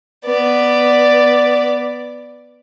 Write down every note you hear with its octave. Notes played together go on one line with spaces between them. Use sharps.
B3 D5